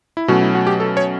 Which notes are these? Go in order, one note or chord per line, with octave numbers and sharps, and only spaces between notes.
E4
B2 F#3 A3 C#4 F#4
E4
F#4
G4
A4
C#5